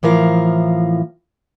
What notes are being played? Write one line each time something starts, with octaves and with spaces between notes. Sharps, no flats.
A2 E3 F3 A#4 F5